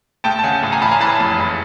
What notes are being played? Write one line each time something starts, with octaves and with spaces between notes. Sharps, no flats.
D2 G5 A5
A5
C#3 F#5 G#5
A1
G#5 A#5
A1 A5 B5
G#5 A#5
E3 A5 B5
F1
F#1